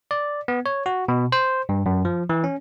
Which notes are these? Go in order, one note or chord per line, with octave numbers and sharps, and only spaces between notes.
D5
B3
C#5
F#4
B2
C5
G2
F#2
F3
E3
C#4